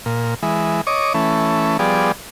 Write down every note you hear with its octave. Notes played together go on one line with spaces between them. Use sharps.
A#2
E3 G#3
C#5 D#5 D6
E3 A3 C#4
F3 G3 B3 G#4 D5